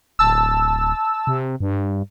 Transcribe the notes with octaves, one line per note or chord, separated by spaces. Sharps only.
D1 A5 E6
C3
G2